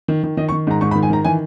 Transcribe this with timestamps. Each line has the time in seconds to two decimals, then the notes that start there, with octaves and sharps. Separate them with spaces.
0.08 D#3
0.23 D#3
0.37 D#3 D#5
0.49 C#6
0.52 D#3
0.67 G#2 A#5
0.81 G#2 C#6
0.91 B5
0.95 D#3
1.03 G#5
1.10 D#3 A#5
1.25 E3 G#5